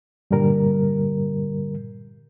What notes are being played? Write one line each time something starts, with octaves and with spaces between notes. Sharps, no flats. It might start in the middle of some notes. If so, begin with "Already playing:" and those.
G2 A#2 D3 G3 A#4